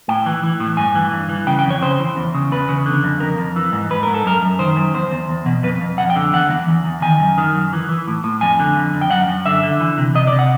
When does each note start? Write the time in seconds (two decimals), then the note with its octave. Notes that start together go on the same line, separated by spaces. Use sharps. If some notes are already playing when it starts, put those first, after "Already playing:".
0.08 A2 G5
0.26 E3
0.43 E3
0.60 A2
0.77 G2 G#5
0.95 E3
1.12 G2
1.29 E3
1.47 C#3 G5
1.59 G5
1.64 F2
1.70 C#5
1.82 C#3 C5
2.00 E3
2.17 E2
2.35 C#3
2.52 E2 B4
2.69 C#3
2.86 D3
3.04 F2
3.20 F2 A#4
3.38 F2
3.56 E3
3.73 G#2
3.90 G#2 B4
4.03 G#2 A#4
4.14 A4
4.25 F#2 A#4
4.42 F#2
4.59 D#3 C5
4.76 F#2
4.94 E2 C5
5.12 E2
5.29 E2
5.46 B2
5.63 F2 B4
5.81 F2
5.98 F2 F#5
6.10 G5
6.16 D3
6.33 E2 F#5
6.50 E3
6.68 E2
6.85 E2
7.02 D#3 G#5
7.20 F#2
7.38 D#3
7.55 F#2
7.73 E3
7.89 E3
8.08 A2
8.24 A2
8.41 F2 G#5
8.60 D3
8.76 F2
8.94 F2
9.01 G5
9.11 F#2 F#5
9.28 F#2
9.46 D3 E5
9.63 D3
9.80 E3
9.98 C3
10.15 C3 D#5
10.27 D5
10.32 C3
10.39 F#5